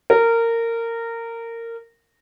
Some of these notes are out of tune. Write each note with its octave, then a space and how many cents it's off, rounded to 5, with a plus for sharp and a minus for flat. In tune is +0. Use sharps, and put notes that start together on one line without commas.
A#4 -20